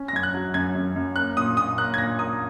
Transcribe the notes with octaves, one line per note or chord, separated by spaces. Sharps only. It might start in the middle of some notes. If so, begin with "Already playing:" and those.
Already playing: C#4
A#6
F#2 G#6
F#6
F#3
F#2 G#6
F#2
F#2
A#3 F#6
A#2 D#6
A#2 D#6
A#3 F#6
G#6
A#2 A#6
A#3 D#6